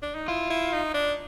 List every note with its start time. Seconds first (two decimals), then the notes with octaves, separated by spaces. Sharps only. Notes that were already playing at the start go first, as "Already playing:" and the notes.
0.02 D4
0.15 D#4
0.28 E4 F4
0.50 E4
0.73 D#4
0.94 D4